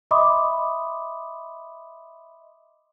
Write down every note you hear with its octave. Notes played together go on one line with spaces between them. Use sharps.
D#5 E5 B5 C6 D6 D#6